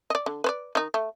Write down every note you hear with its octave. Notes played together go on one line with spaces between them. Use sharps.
D5 D#5
D3
B4 C5 D5
D#3 D#4
A3